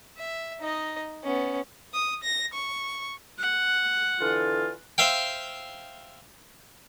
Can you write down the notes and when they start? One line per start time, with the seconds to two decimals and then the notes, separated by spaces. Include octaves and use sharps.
0.17 E5
0.60 D#4 D#5
1.23 B3 C#4
1.94 D#6
2.23 A#6
2.53 C#6
3.39 F#5
4.21 D3 E3 F4
4.98 C5 E5 F5 G5